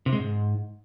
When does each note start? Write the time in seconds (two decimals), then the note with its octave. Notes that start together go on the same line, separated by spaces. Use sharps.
0.06 C3
0.12 G#3
0.19 G#2